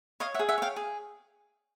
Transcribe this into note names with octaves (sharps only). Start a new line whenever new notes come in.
C#5 D#5 F5
E5 F#5
G#4
E5 F#5
C#5 F5 G5
G#4